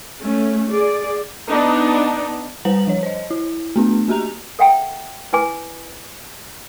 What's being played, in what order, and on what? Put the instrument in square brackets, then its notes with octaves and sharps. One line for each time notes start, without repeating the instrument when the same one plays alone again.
[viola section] A3 C#4
G#4 D5
B3 D4 D#4
[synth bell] G3 B4 C5 F#5 A#5 F#7
F3 C#5
C5 D#5
E4
A3 B3 D4
A#3 F#4 G4 A#5 F7
[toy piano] A4 E5 F#5 G5 A#5
E4 B4 G#5 D6